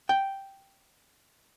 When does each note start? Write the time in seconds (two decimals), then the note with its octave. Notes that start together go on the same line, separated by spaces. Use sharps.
0.09 G5